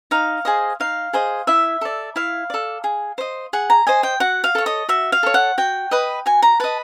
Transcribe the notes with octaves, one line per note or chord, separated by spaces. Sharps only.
D#4 F5
G#4 C5 D#5
D#4 F5
G#4 C5 D#5
E4 E5
A4 D5
E4 F5
A4 D5
G#4
C5 D#5
G#4 F#5
A#5
C5 D#5 G#5
G5
F#4 F#5
F5
A4 C#5
D#5
F#4 E5
F5
A4 C#5
F#5
F#4 G5
B4 D#5
F#4 G#5
A#5
B4 D#5 A5